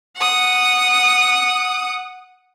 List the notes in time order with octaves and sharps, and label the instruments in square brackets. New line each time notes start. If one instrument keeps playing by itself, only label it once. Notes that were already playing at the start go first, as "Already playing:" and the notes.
[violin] F#5 D#6